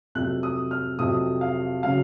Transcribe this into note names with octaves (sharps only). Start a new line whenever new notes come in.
F2 C3 F#3 F#6
D#6
F6
F2 C3 F#3 D#6
F5
C#3 F#3 F5